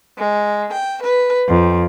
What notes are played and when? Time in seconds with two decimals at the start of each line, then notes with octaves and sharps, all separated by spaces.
0.19 G#3
0.73 G5
1.04 B4
1.48 F2